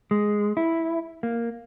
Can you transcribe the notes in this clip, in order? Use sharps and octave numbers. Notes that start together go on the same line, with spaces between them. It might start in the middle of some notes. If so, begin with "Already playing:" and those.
G#3
E4
A#3